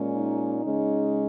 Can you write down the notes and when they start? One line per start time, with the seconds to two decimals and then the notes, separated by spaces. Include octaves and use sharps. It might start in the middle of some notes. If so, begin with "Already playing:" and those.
Already playing: A#2 G#3 C#4
0.14 D#4
0.62 C#3 G#3 C#4